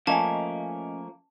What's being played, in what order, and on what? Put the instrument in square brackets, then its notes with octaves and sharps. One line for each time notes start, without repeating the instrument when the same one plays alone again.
[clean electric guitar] F3 A3 A#3 [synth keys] C#4 D#5 G#5 [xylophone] A5